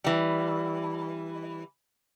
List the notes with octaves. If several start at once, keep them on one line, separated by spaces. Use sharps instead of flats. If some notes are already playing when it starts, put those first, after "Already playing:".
E3 G3